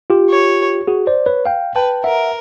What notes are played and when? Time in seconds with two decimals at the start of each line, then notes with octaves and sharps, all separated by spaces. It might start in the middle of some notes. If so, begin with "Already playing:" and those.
0.10 F4 G4
0.30 C#5
0.87 F#4 G#4
1.07 C5 D5
1.26 B4 C#5
1.46 F5 G5
1.75 B4 G5 A5
2.04 A#4 E5 F#5